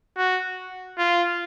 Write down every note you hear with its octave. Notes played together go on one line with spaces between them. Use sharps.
F#4
F4